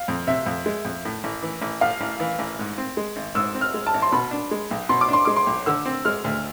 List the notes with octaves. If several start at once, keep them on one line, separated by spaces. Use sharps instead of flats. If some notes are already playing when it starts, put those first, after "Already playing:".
Already playing: F5
F2
C3 E5
F2
G#3
F2
A2
A1
E3
A1
A2 F5
A1
E3
A1
G#2
C4
G#3
G#1
G#2 E6
C4
F6
G#3
A5
G#1
C6
B2 B5
D4
G#3
B1
B2 C6
D6
D4 C6
G#3 D6
C6
B1
D3 E6
C4
G#3 F6
D2